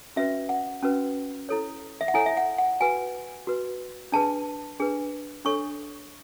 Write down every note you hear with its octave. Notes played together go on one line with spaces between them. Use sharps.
C#4 F#4 B4 E5
F#5
C#4 F#4 B4
E4 A4 C#5
E5
F#5
E4 A4 C#5 G#5
E5
F#5
F#5
F#4 B4 G#5
F#4 B4
D4 G#4 B4 A5
D4 G#4 B4
D4 A4 C#5 C#6